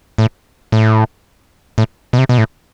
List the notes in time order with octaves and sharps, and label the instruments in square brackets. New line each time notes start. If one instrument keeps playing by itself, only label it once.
[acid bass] A2
A2
A2
B2
C3
B2
A2